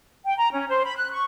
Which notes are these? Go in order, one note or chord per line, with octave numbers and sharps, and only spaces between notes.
G5
A#5
C#4
C5
B5
F#6
C#6